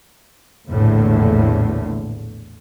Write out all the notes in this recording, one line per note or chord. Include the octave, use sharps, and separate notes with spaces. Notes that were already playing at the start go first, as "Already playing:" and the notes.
A#1 E2 A2 D3